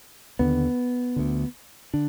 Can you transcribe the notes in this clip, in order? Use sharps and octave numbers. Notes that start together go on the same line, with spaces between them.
D#2 D3 B3
D2 D3
D3 D4